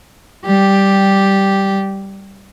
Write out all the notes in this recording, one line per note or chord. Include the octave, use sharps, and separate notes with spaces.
G3 G4